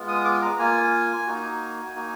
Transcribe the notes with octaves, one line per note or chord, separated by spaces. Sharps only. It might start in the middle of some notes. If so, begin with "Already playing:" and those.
Already playing: G#3 B3 F4
D#6
D6
A#5
A#3 F4 G#5
A#3 D#4 F#4
A#3 D#4 F#4